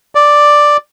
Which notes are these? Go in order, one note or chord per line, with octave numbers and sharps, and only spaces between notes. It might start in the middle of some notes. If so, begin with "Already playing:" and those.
D5